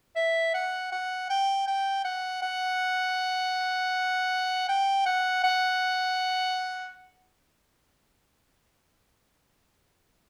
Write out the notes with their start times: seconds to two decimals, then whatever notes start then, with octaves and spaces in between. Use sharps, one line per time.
0.16 E5
0.54 F#5
0.92 F#5
1.30 G5
1.67 G5
2.05 F#5
2.42 F#5
4.69 G5
5.06 F#5
5.44 F#5